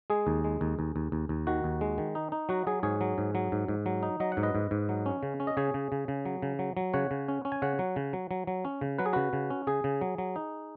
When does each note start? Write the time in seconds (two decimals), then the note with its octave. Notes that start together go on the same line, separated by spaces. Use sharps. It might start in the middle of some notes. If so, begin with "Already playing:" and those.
0.10 G#3 G#4
0.27 D#2
0.44 G#3
0.61 D#2
0.79 D#2
0.96 D#2
1.12 D#2
1.29 D#2
1.47 D#3 F#4
1.64 D#2
1.81 G#3
1.98 D#3
2.15 D#4
2.32 D#4
2.49 F#3 F#4
2.67 F#3 G#4
2.83 G#2 G#4 C#5
3.01 F#3
3.18 G#2
3.35 F#3
3.52 G#2
3.68 G#2
3.86 F#3
4.03 D#4
4.20 F#3 D#5
4.32 F#5
4.37 G#2
4.43 B4 D#5
4.55 G#2
4.71 G#2
4.89 F#3
5.06 C#4
5.23 C#3
5.40 C#4
5.47 D#5
5.57 C#3 G#4 C#5
5.74 C#3
5.92 C#3
6.08 C#3
6.25 F#3
6.42 C#3
6.59 F#3
6.77 F#3
6.94 C#3 C#5 F#5
7.11 C#3
7.28 C#4
7.45 C#4
7.52 G#5
7.62 C#3 C#5 F#5
7.79 F#3
7.96 C#3
8.13 F#3
8.31 F#3
8.47 F#3
8.65 C#4
8.81 C#3
8.98 F#3 B4
9.06 G#4
9.13 C#3 F#4 B4
9.33 C#3
9.50 C#4
9.67 C#3 G#4
9.84 C#3
10.01 F#3
10.18 F#3
10.36 D#4